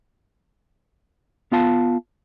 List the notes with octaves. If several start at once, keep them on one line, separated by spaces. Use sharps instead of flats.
B3 F4 F5 A5